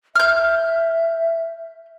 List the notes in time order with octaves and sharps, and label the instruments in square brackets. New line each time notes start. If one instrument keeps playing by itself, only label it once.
[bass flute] E5 [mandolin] F6 G6